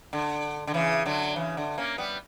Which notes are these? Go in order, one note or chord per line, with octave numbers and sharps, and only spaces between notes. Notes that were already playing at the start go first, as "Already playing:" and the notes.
D3
D3
C#3 E3
D3 F#3
C#3 E3
D3
A#3 C#4
G3 B3